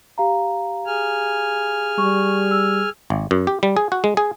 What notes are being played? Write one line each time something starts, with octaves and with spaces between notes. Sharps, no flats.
G4 F5 A#5
G#4 G#5 F6
G3 C#6
E6
G#1
F#2
G4
G3
G#4
F#4
G#3
G#4